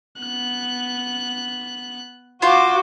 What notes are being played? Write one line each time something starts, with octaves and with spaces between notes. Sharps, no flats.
B3 F#6
F4 F#4 C5 D6